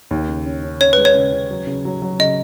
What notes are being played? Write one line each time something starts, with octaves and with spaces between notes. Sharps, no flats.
D#2
C#3
C#4
C#4
C#4 C#5
G#3 B4
C#5
C#3
C#3
F#3
C#3
F#3
F#3
C#3 D#5